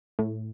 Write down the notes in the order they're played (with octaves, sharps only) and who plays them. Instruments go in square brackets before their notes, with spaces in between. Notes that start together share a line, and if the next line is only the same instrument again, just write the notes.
[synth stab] A2